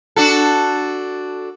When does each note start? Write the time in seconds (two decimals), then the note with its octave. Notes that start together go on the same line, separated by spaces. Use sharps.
0.16 D4 F#4 A4